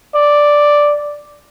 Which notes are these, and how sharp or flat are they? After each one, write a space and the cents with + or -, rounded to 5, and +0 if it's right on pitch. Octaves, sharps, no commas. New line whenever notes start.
D5 +0